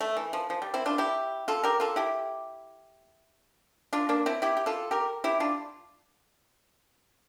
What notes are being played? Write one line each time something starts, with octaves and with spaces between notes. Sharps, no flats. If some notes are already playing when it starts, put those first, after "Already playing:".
A3
E3
F3
F3
G3
C4 E4
D4 F4
E4 G4
F4 A4
G4 A#4
F4 A4
E4 G4
D4 F4
A#3 D4
C4 E4
E4 G4
G4
F4 A4
G4 A#4
E4 G4
D4 F4